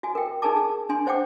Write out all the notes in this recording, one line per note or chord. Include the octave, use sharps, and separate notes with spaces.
F#4 G#5
A#4 G5
D#4 G#4 A#4 G#5 A5 D6
G#4
D4 G#5 C6
D4 C5 F#5 G5 D6